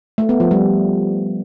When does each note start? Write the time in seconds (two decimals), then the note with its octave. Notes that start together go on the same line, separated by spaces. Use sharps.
0.18 A3
0.29 B3
0.40 F3
0.51 G3